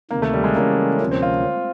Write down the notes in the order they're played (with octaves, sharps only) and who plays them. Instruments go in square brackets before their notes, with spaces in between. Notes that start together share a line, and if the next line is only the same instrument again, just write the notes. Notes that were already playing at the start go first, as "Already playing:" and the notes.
[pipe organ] D2 C3 D#3 [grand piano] A#3
[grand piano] A3
G3
G#3
[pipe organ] C#3 E3 A3 C#4 [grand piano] A#3
[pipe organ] D2 C3 F3 A#3 C#4
[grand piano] C4
F4